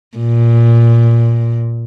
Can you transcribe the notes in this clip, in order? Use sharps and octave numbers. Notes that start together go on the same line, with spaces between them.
A#2